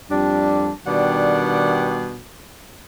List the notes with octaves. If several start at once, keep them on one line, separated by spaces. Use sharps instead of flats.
F2 G3 D4
B2 D#3 G3 D4 D5 F#5